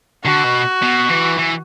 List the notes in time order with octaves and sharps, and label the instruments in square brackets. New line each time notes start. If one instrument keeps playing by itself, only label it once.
[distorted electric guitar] D3 [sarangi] F#4
[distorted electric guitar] B2
B2
E3
E3